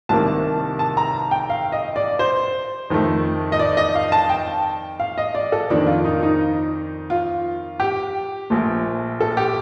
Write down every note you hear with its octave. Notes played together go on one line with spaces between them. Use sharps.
C2 C3 D#3 A#3 A5
A5
A#5
G5
F5
D#5
D5
C5
F2 D#3 A3
D#5
D5
D#5
F5
A5
G5
F5
D#5
D5
A4
F2 D#3 A#3 D4
F4
D#4
D#4
F4
G4
A#1 A#2 A3
A4
G4